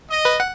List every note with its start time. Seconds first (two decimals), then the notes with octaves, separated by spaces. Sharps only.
0.10 D#5
0.25 B4
0.40 F#5